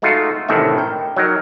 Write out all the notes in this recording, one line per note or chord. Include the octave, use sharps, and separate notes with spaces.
G#3 A3 D#4 F4 F#4
A1 A2 C3 D#3 D4 E5
A#4 G5
F#3 D#4 A#4